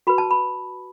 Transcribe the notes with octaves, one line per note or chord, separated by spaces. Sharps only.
F#4 B4 B5
A5
B5